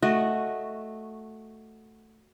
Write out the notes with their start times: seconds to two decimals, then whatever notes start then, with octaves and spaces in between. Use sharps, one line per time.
0.02 A3 F#4 D#5